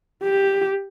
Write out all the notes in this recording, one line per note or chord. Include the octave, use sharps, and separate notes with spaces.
G4